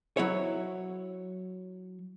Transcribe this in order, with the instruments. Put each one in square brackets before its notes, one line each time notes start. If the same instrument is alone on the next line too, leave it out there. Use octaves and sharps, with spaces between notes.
[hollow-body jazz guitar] F#3 E4 C#5